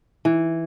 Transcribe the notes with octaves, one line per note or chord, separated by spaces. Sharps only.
E3